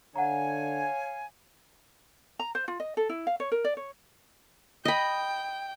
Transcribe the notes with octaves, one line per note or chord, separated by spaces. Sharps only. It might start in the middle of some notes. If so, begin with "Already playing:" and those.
D3 C#5 F5 F#5 G#5 A#5
A#5
C5
F4
D#5
A4
E4
F5
C#5
A#4
D5
C#5
D#5 G5 B5